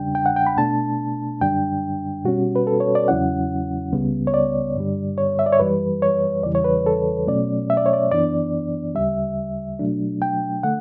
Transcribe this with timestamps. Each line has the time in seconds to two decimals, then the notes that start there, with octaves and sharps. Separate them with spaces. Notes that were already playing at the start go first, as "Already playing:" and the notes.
Already playing: E2 C#3 G3 D4 G5
0.15 G5
0.26 F#5
0.36 G5
0.47 B5
0.57 B2 A3 D4 A5
1.41 F#2 D3 G3 D4 G5
2.25 B2 G3 C#4 F#4
2.56 B4
2.67 A4
2.80 C#5
2.95 D5
3.08 E2 C#3 F#3 C#4 E4 F#5
3.92 C#2 C#3 G3 B3
4.27 C#5
4.34 D5
4.76 G2 D3 G3
5.18 C#5
5.39 E5
5.46 D5
5.52 C#5
5.60 F#2 E3 G3 B4
6.02 C#5
6.43 E2 C#3 E3 G3 D5
6.55 C#5
6.64 B4
6.86 A4
7.27 B2 F#3 A3 C#4 D5
7.70 E5
7.77 D5
7.86 C#5
7.93 D5
8.11 F#2 E3 B3 D4 D5
8.95 D2 C#3 G3 E5
9.80 B2 F#3 A3 D4
10.22 G5
10.63 D3 A3 F#5